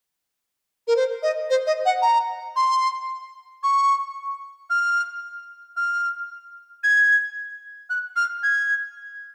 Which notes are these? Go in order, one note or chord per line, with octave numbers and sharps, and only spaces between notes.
A#4
C5
D#5
C5
D#5
F#5
A#5
C6
C#6
F6
F6
G#6
F#6
F6
G#6